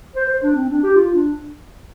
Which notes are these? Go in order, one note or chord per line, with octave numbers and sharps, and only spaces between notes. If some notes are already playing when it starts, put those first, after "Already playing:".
C5
C5
D4
C4
D4
G4
F4
D4